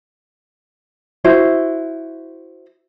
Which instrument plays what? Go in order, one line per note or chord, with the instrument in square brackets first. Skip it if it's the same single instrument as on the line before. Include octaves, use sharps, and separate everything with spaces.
[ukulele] E4 F#4 C5